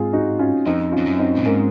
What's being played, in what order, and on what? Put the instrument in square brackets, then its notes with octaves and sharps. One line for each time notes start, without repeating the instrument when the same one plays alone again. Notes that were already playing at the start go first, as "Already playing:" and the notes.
Already playing: [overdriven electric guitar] G#2 [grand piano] G#3 C4 F4 G#4
[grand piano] D#4 F#4
C#4 F4
[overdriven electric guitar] F2 [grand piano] C4 D#4
[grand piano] C#4 F4
[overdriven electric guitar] F2
F#2
[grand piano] C4 D#4
[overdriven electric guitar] A#2
[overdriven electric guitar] G#2 [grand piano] A#3 C#4